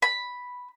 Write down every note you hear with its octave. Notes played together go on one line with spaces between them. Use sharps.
B5